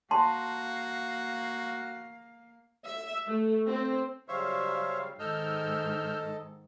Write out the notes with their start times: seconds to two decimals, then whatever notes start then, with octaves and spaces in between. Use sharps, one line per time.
0.11 A#3 F#4 F5 A5 C6
2.86 E5
3.27 A3
3.69 C4
4.28 C#3 F#3 G3 C5 C#5 E5 F5
5.19 G#2 D#3 A4 D#5 E6 F6 G6